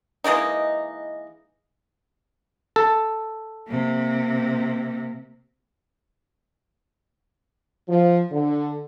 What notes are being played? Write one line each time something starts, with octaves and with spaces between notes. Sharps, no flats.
E3 G#3 A#3 D#4
A4
C3 A#3
F3
D3